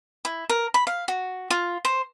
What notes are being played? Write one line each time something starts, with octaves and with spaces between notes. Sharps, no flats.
E4
A#4
B5
F5
F#4
F4
C5